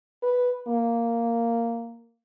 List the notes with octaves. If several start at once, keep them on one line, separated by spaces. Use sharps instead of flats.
B4
A#3